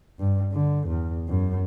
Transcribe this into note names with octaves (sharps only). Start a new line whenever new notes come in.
G2
D3
E2
F#2